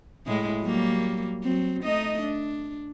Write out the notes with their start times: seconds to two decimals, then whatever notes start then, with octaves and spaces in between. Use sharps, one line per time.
0.27 A2 G#3 E4
0.62 F#3 G3 A#3
1.43 F#3 C4
1.83 A3 D#4 D#5
2.22 D4